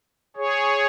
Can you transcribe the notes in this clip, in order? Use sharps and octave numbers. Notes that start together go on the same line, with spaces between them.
G#4 C#5